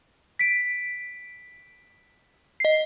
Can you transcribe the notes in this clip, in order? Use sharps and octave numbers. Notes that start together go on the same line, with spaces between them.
B6 D7
D#5 C7